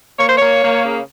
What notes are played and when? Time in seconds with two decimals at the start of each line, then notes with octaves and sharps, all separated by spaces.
0.19 A#3 C#5
0.28 C5
0.38 A#3 C#5
0.63 A#3
0.84 C#3